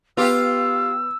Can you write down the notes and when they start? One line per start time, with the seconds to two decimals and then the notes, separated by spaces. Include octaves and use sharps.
0.17 B3 F4 G4 E6